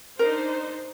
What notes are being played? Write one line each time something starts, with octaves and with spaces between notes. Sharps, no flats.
D4 D#4 A#4 C5